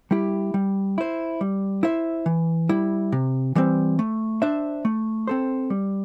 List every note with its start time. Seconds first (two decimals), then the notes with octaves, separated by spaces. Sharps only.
0.11 G3 E4 G4
0.54 G3
0.98 E4 C5
1.41 G3
1.83 E4 C5 E5
2.26 E3
2.69 G3 E4
3.12 C3
3.55 E3 G3 C4
3.99 A3
4.42 D4 C5 E5
4.85 A3
5.27 C4 A4 C5
5.70 G3